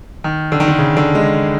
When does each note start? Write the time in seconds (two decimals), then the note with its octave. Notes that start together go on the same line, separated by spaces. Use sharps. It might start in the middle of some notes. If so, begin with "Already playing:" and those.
0.24 D#3
0.52 D3
0.60 D#3
0.68 D3
0.79 C#3
0.97 D3
1.15 G#3